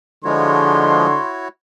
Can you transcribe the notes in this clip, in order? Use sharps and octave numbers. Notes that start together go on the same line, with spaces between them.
D3 F3 G#3 E4 F#4 C#5 C6